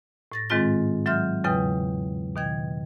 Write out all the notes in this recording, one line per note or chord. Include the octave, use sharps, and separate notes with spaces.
A2 A6 A#6
G#2 D#3 G#3 C4 F4 A6
F#3 E5 C6 F6 G6
E2 C#3 F#3 B4 G5 D#6
B2 D#3 G5 G#6